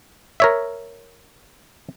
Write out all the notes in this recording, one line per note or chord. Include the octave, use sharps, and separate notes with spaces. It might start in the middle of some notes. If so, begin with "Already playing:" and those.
A#4 C#5 E5